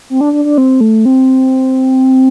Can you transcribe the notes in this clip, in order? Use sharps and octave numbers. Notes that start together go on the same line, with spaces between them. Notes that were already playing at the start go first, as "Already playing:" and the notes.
C4
D4
D4
D4
C4
A3
C4